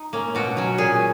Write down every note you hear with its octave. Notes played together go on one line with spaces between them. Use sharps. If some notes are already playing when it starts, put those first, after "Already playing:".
Already playing: D#4
A#3 C#4
B2 F#4
F#3 C#4
A#2 G#4